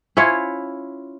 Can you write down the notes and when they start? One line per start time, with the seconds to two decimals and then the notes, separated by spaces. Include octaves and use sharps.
0.17 C#4 E4 F4 C#5